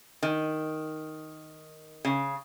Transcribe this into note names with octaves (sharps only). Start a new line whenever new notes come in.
D#3
C#3